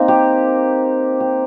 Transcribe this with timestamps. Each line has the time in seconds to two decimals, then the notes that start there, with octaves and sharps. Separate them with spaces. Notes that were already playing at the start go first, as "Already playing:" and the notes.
Already playing: A#3 C4 D#4
0.08 G4
1.20 G4